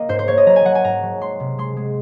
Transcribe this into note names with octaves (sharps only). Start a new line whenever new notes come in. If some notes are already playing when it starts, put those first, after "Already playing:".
Already playing: A#3 D#5
G#2 C5
C5
A#3 C#5
D#5
F#3 A#5
G#5
F#3 F#5
G#5
G#2 A#5
F#3
G#3 C6
C3
G#3 C6
G#3